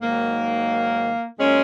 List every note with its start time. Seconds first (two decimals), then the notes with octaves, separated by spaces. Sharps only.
0.02 G#2 D#3 F#3 A#3
1.38 A#2 F#3 G#3 C#4